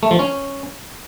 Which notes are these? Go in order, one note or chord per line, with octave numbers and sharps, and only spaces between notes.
A3
F3
C#4